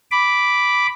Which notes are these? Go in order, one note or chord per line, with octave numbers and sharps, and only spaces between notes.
B5 D6